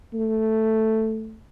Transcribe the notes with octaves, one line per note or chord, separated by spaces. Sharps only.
A3